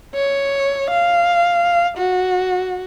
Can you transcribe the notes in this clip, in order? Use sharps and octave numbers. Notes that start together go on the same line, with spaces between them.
C#5
F5
F#4